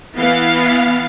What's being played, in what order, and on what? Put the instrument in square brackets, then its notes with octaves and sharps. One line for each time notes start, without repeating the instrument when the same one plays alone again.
[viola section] E3 B3 F5